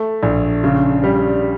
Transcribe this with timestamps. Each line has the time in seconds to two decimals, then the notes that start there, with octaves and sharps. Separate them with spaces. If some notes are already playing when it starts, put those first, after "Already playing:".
Already playing: A3
0.23 A#1
0.64 C#3
1.04 G3